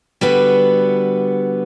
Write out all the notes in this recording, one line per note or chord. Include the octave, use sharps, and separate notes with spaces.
D3 G3 B3 F#4 B4